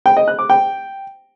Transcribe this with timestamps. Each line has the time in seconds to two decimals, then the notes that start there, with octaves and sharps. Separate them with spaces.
0.06 G5
0.17 D#5
0.28 F#6
0.39 D6
0.50 G5